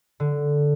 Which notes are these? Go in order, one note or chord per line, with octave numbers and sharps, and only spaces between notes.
D3